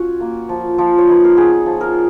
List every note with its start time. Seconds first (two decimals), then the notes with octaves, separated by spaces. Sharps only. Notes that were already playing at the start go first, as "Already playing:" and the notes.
Already playing: C#4 F4 F#4
0.21 A#3
0.49 F3
0.78 F3
0.98 C#5
1.08 D#4 B4
1.24 A#4
1.37 B3 G#4
1.66 F3
1.81 A#4